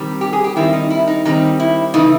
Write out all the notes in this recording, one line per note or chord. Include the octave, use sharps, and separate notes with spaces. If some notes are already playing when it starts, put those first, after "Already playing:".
Already playing: D#3 G3 C4
G4
G#4
G4
D#3 G3 C4 E4
D#4
E4
D#4
D#3 G3 C4 D#4
E4
C#3 E3 A3 D#4